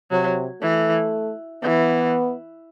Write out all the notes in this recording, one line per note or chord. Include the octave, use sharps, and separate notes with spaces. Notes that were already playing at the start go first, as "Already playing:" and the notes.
C3 F#3
E3 A3
E3 B3